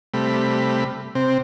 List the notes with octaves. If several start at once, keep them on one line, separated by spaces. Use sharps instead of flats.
C3 G3 A3 B5
C3 C4